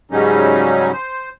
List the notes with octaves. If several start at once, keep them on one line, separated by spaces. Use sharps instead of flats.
G#2 C#3 F#3 G3 C#4 D#4
C5